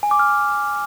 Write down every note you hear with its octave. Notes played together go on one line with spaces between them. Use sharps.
G#5
D6
F6